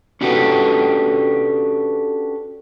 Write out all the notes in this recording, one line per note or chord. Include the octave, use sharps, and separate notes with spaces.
C#4 D4 F#4 G4 A4 B4